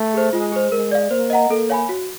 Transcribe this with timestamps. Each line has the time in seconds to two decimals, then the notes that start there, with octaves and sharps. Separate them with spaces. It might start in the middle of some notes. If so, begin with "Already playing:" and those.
Already playing: A3
0.14 G#4 C5
0.33 G#3 F4
0.52 G#4 C5
0.72 G#3 A#4
0.91 D5 F5
1.11 A#3 C5
1.30 D#5 F#5 A#5
1.50 A#3 A4
1.70 C#5 F5 G#5 B5
1.89 F#4